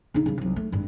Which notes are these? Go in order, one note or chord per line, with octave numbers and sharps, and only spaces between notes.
C#3 D#4
C#3 G3
C2 F#3
A3
G#1 G2